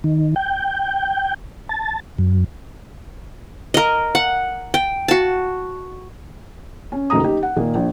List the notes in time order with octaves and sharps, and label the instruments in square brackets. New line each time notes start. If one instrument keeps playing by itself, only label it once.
[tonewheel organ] D#3
G5
A5
F#2
[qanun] A#4 D#5
F#5
G5
F#4 A5
[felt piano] C#4
F#1 D#3 F#3 A3 A#5 D#6
D#4 G4
F#5
A#2 D#3 A#3 D#4
A#1